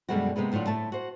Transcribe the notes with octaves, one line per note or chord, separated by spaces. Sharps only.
F#2 B2 D3 G3 G#3 F#4
C3 G#3 A#3 B3
A2 D3 F#3 F4
A2 A3 A5
F#4 C5